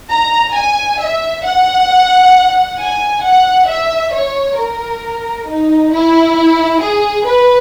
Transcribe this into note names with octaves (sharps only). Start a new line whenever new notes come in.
A#5
G#5
E5
F#5
G#5
F#5
E5
C#5
A#4
D#4
E4
G#4
B4